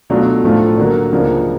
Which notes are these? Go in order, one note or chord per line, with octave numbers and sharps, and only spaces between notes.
B2 F#3 A3 D4 F4
A2 F3 A3 D4 F4
D3 F#3 A#3 D4
C#2 C#3 F3 A#3 D4